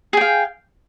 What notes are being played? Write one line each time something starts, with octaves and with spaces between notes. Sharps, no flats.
G#4 F5 G5